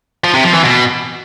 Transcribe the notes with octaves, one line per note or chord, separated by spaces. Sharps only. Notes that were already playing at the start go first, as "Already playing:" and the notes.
F3
C3
F3
E3
B2